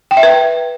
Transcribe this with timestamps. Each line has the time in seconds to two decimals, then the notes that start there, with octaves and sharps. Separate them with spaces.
0.11 G5
0.17 E5
0.23 B4